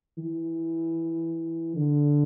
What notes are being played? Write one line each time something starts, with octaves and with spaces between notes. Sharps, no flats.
E3
D3